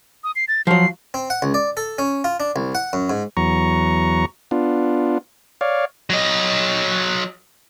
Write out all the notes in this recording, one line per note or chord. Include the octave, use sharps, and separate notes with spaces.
D#6
C7
A6
F3 F#3 C7
C4
F#5
C#2
D5
A4
C#4
F4
D4
C2
F#5
F#2
G#2
E2 F#3 A#5 C#6
B3 D4 F4
C#5 D5 F5
F#3 D#5